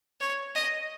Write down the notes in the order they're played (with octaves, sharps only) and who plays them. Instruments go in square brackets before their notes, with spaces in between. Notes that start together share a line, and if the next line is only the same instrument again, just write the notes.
[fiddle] C#5
D#5